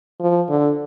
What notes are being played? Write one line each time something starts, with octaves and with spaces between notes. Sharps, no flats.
F3
D3